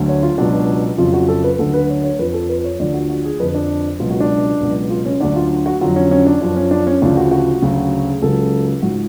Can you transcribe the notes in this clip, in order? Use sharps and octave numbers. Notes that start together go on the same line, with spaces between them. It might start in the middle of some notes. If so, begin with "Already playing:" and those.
Already playing: D2 D3 F#3
C#5
F4
C#2 B2 F#3 D4
F2 C#3 F#3 F4
F#4
A4
B4
D2 D3 F#3 A4
B4
C#5
C#5
F2 F3 B4
A4
B4
C#5
D2 D3 F3 D5
F#4
F#4
G#4
F2 D3 F3 B4
D4
C#2 B2 F#3 F4
F#4
D4
C#2 B2 F#3
F4
C#4
D2 D3 F#3 D4
F4
F#4
F2 D3 F#3 F4
C#4
C#4
D4
F#2 F3 D4
C#4
D4
C#4
D2 C#3 F3 D4
F#4
F#4
D2 C#3 F#3
G#4
C#2 C#3 F#3 A4
G#2 F3 F#4